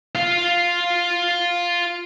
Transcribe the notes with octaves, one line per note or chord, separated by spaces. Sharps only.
F4 F5